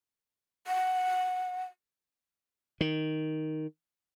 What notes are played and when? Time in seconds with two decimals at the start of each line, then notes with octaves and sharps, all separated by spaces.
0.67 F#5
2.81 D#3